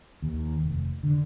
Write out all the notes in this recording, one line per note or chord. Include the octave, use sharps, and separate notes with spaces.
D#2
F1
D3